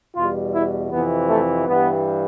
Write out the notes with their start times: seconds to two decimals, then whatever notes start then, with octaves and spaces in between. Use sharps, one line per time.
0.15 E2 B2 G3 F4
0.53 E4
0.91 F2 C3 E3 B3
1.29 A3
1.66 G2 E3 G3 B3